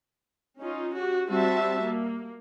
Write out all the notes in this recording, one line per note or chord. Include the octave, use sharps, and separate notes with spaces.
C#4 D#4 F4
F#4 G4
G3 C4 F#4 E5 A5
A#3